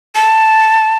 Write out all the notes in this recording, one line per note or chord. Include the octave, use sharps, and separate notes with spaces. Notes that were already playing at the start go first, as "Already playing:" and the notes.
A5